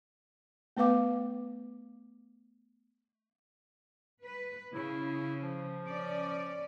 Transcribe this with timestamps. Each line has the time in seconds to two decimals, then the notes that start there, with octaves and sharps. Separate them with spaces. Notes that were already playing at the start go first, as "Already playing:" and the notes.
0.77 A3 B3 B4 F5 D6
4.23 B4
4.74 C#3 E4
5.41 F3
5.88 C#4 D5